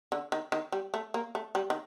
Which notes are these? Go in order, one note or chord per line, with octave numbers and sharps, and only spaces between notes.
D3
D#3
D#3
G3
A3
A#3
A3
G3
D#3